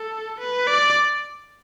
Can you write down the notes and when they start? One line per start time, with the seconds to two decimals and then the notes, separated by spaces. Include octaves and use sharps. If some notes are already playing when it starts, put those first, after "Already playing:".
Already playing: A4
0.40 B4
0.67 D5